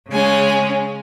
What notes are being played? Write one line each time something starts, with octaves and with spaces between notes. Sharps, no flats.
C#3 G#3 C#4 G#5